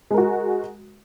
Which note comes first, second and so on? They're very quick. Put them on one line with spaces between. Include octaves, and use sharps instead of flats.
G#3 A#4 F#4